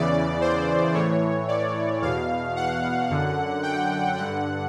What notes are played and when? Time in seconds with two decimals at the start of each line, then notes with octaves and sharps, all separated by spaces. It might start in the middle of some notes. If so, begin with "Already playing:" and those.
Already playing: E2 C#3 E3 D5
0.41 C5
0.94 A2 E3 C#5
1.48 D5
2.02 E2 B2 F5
2.56 F#5
3.10 F#2 D3
3.63 G5
4.17 G2 D3 F#5